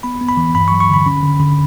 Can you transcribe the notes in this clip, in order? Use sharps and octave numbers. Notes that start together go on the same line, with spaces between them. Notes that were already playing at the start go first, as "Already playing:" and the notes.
B3 B5
B3
B5
E3
G2 B5
C#6
F#3
C#6
D3 B5
C#4
D3
D3